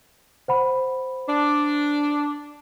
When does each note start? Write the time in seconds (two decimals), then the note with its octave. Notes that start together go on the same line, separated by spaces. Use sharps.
0.48 C5 F#5 B5
1.28 D4